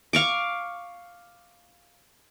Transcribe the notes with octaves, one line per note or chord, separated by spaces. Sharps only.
F5 C#6 D6